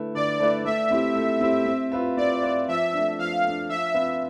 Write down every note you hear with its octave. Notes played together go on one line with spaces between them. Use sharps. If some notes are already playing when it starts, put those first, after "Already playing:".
Already playing: D3 A3 E4 B4 E5
D3 D5
A3 E4 B4 E5
A3 E5
C4 E4 G4
A3
C4 E4 G4
C4
F4 B4 E5
C4 D5
F4 B4 E5
F3 E5
A3 D4
F3 F5
A3
D4
F3 E5
C4 F4 B4 F5